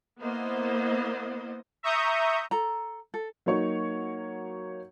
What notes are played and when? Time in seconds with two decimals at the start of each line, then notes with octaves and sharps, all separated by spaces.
0.19 A#3 B3 E4 C5 D#5
1.83 E5 A#5 C#6 D#6 G6
2.51 A4 A#5
3.14 A4
3.46 F#3 A#3 D#4 C#5 C#6